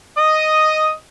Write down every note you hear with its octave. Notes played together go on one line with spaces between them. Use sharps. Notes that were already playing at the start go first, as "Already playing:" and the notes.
D#5 D#6